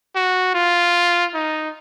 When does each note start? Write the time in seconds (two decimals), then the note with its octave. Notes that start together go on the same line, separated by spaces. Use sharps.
0.16 F#4
0.55 F4
1.34 D#4